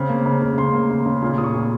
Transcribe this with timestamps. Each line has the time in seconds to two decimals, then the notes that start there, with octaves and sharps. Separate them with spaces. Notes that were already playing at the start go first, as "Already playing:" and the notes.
Already playing: C#3 C4
0.09 A#3
0.26 C#3
0.42 C#3
0.57 C#3 C6
0.73 A#3
0.90 C#3
1.06 C#3
1.22 A#2 C6
1.38 A#2 D#6
1.44 C#6
1.54 A#2